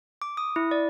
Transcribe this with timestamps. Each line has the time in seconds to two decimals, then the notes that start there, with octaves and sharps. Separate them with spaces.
0.22 D6
0.37 D#6
0.56 E4
0.71 D5